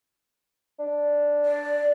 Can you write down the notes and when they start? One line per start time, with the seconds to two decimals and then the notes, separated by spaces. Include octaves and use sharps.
0.79 D4
1.45 D5